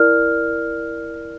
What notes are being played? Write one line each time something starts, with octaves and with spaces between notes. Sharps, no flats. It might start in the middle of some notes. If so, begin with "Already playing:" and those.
Already playing: E4 A#4 D5 F6